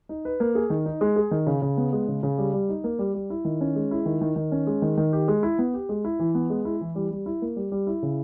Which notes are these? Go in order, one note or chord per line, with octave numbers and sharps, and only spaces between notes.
D#4
B4
A#3
G#4
D#3
D#4
G#3
G#4
D#3
C#3
C#3
B3
G#3
C#3
C#3
G3
G3
D#4
A#3
G3
G3
E4
D#3
C#4
G#3
E4
D#3
D#3
D#3
C#4
G#3
D#3
D#3
G4
G#3
E4
B3
G4
G#3
E4
E3
B3
G#3
E4
E3
G3
G3
E4
A#3
G3
G3
E4
C#3